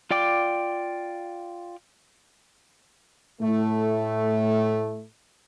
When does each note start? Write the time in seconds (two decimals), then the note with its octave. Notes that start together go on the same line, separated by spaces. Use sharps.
0.11 F4 D5 G5 D6
3.41 A2 A3